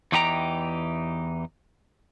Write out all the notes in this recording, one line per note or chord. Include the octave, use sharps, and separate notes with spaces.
E2 E3 D#4 G4 G5 A#5